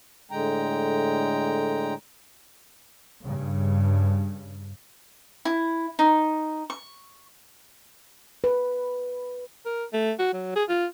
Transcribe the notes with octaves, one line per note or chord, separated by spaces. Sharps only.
A2 D3 G#3 G5 A#5
G2 C#3
E4
D#4
C#6
B4
A#4
A3
F#4
F#3
G#4
F4